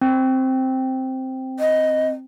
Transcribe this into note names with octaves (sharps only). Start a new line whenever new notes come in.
C4
D#5